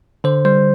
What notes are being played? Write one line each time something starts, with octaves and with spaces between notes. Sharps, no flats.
D3 C5
G3 C5